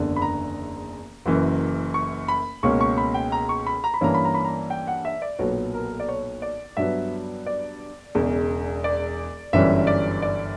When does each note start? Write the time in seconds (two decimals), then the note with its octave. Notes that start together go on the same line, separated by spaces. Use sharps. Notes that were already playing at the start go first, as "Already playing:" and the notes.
Already playing: F#1 E2 D3
0.16 B5
0.22 A#5
1.26 F#1 F#2 E3
1.94 C#6
2.28 B5
2.63 C#2 B2 A#3 C#4 C#6
2.81 C#6
2.98 B5
3.14 G5
3.32 A#5
3.49 C#6
3.67 B5
3.84 A#5
3.94 B5
4.01 G2 E3 A#3 C#4 A#5
4.14 B5
4.25 A#5
4.35 B5
4.45 A#5
4.70 G5
4.87 F#5
5.05 E5
5.22 D5
5.39 B1 A#2 F#3 B3 C#5
5.74 A#4
6.00 D5
6.08 C#5
6.42 D5
6.77 G2 F#3 B3 E5
7.46 D5
8.15 E1 E2 C#3
8.84 D5
9.53 G1 F#2 E3 G3 C#4 E5
9.87 D5
10.22 D5